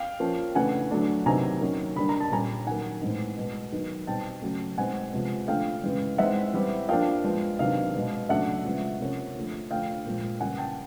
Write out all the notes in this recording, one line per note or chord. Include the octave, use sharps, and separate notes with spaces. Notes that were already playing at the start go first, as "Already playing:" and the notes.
Already playing: F5 G5
F3 A#3 C#4
C#3 E3 A3 D4 F#5 G#5
D3 F#3 A3 D4
C3 D#3 F#3 B3 D4 G#5 A#5
D#3 F#3 A#3 C#4
D3 G3 A#3 D4 B5
A#5
A5
A#2 G3 A#3 C#4 G#5 A#5
D#3 F#3 A#3 F#5 G#5
A2 E3 G#3 C4 D#4
B2 G#3 B3
D#3 F#3 B3 D#4
B2 G3 C4 D#4 G5 A5
C#3 F#3 A3
B2 G#3 C4 D#4 F#5 G#5
C3 F3 G#3 B3
D3 F3 A3 F5 G5
C#3 E3 G#3
E3 G#3 C4 D#4 E5 F#5
E3 G3 C4
F3 A#3 D4 F5 G5
F3 G#3 B3
C3 D#3 F#3 B3 D4 F5
B2 G#3 B3
C#3 F#3 A3 D4 E5 F#5
C#3 F3 G#3 B3
C3 F3 A#3 C#4
D3 F3 A3
D3 F3 A3 D4 F5 G5
A#2 F3 G#3
C#3 E3 G3 A#3 F#5 G#5
G5 A5